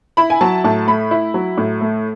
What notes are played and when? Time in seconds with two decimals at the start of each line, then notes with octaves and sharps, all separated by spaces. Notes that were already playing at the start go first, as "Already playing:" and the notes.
0.17 E4 B5
0.30 G#5
0.41 F#3 A5
0.64 A2 A5
0.87 A3 B5
1.11 E4
1.34 F#3
1.57 A2
1.81 A3